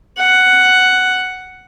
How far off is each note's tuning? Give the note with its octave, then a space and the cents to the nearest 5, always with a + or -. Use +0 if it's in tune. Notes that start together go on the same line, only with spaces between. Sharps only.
F#5 +5